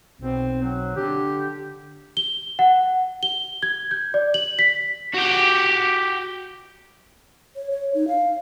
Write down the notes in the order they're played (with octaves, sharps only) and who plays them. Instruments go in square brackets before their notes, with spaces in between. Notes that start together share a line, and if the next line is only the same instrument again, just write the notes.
[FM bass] B1 [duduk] C4
[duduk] F#3
[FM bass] D3 [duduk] G4
[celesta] G7
F#5
G7
G#6
G6
D5
F#7
B6
[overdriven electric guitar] F#4 G4
[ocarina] C#5
C#5
D#4
F5